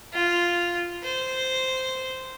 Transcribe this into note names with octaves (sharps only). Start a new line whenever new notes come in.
F4
C5